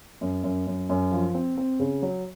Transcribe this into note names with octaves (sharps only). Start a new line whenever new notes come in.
F#2
F#2
F#2
F#2
F3
C4
C4
C#3
F#3